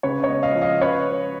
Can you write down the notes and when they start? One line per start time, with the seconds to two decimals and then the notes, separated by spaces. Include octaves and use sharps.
0.03 C#3 B4 C#5
0.23 C#5 D#5
0.29 B3
0.43 D#5 F5
0.55 F3
0.61 D#5 F5
0.81 C#4 B4 C#5